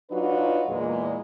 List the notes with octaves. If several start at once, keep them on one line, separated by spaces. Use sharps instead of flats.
F#3 D4 D#4 F4 F#4 B4
E2 A#2 G#3